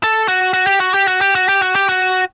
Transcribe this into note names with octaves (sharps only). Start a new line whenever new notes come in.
A4
F#4
F#4
G4
F#4
G4
F#4
G4
F#4
G4
F#4
G4
F#4